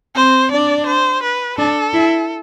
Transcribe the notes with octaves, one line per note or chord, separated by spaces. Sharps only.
C4 C5
D4 D5
C5
B4
D4 A4
E4